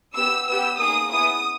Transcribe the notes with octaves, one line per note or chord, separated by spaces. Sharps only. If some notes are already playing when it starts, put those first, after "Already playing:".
B3 G4 E6
B3 G4 E6
A#3 D#4 G#4 D#6
B3 E4 G#4 D#6